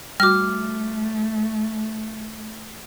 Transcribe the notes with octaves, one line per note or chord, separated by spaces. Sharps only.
G3 A3 F#4 D6 F6